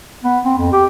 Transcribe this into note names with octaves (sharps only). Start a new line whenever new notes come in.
B3
C4
F2
G4